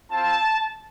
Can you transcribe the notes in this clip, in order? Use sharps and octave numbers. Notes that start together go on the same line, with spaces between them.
C4 F4 A5